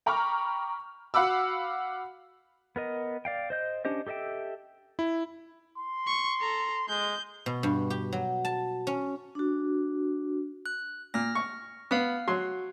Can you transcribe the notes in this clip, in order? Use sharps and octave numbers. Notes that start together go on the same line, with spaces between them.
G5 A#5 B5 C#6 D6 F6
F#4 F5 F#5 B5 D6 E6
B3 A#4 D#5
D5 F5 G5
C5 D#5 G6
C#4 D4 G4 C5 D#5
G4 A4 D#5 E5 G5
E4
C6
C#6
A4 A#5
G#3 G6
B2
G2
G4
F#3
A5
C#4
D4 F#4
F#6
A#2 F6 A#6
C#6
B3 F5 F6
F#3 F#4 C6